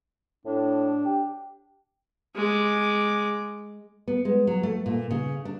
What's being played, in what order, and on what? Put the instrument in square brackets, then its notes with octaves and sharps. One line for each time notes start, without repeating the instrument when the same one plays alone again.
[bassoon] A2 [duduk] D4
[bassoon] G4
[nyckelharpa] G#3 D6
[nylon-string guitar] B3
G#3
F#3
A3
A#2
C#3
D4